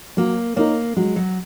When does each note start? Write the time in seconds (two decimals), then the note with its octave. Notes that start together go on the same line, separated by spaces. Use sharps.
0.17 F#3 A#3
0.56 A#3 D#4 A#4 C#5
0.97 F#3 G#3
1.16 F#3